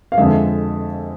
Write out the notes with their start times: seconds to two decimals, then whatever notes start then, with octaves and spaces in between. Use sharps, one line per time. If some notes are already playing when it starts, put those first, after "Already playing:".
0.12 F5
0.17 F2 D3 G#3 E5